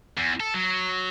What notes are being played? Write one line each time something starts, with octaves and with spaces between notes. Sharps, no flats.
E2
A4
F#3